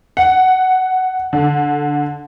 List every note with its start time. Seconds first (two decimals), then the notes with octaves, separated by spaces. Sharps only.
0.17 F#5
1.33 D3